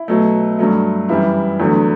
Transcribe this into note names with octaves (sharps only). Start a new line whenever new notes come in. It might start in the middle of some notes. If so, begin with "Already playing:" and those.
Already playing: E4
B2 F#3 A3
G2 F#3 A3
F#2 E3 G3 E4
E2 D3 F#3 A3